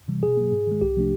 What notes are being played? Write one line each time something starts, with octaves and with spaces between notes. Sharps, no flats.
C3 E3 G3
B2 G#4
F#3 A#3
G#2
D#3 G#3
C2 G4
C3 F3 A3 D4